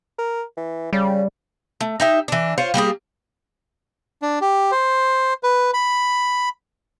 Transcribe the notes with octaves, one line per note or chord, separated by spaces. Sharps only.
A#4
E3
C#3 G3
A3
D#4 G4 E5
E3 D4
F4 C5 C#5
G3 A#3 G4 G#4
D4
G4
C5
B4
B5